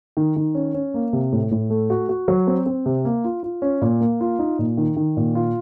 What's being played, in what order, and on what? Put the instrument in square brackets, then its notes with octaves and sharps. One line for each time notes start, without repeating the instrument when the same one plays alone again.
[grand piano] D#3
D#3
C#4
C#4
A#3
C3
A2
A2
A3
F#4
F#4
F#3
C4
C4
C3
A#3
F4
F4
C#4
A#2
A#3
F4
D#4
A#2
D#3
D#3
A#2
F4